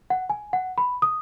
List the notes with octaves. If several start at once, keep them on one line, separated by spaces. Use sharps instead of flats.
F#5
G#5
F#5
B5
D#6